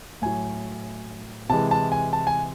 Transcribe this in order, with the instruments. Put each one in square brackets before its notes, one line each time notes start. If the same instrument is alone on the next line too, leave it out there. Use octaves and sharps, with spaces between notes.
[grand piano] A2 F#3 G#5
C3 E3 G#3 A5
A5
G#5
A5
G#5